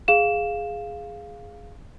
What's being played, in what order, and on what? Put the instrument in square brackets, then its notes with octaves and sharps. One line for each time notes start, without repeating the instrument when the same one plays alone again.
[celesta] G#4 F5 E7